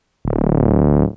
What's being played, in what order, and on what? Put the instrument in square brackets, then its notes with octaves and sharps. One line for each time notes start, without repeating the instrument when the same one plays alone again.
[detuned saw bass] D1